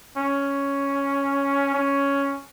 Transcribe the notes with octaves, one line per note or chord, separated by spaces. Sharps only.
C#4
C#4